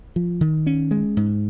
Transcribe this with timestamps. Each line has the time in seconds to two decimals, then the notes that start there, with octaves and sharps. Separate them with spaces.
0.16 F3
0.41 D#3
0.67 C#4
0.91 G#3
1.17 G#2